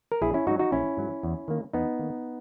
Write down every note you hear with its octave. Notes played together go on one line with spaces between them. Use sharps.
A#4
A#1 E4 G#4
C#4 E4
G#2 F#3 D#4 F#4
D#4 F#4
A#1 C#4 E4
G#2 F#3
E2
D#3 A#3
E2 B3 D#4
D#3 A#3